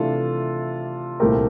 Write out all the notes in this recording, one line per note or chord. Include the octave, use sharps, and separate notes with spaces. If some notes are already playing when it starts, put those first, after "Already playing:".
Already playing: C3 E3 A3 D4 F4 A4
C2 A#2 A3 C4 G4 A#4